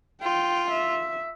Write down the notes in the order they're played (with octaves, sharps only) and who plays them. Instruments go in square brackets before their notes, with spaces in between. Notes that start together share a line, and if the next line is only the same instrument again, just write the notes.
[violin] F4 [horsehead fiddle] G5
[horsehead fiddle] E5